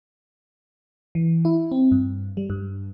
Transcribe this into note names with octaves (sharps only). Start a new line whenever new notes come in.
E3
E4
C4
G2
G3
G2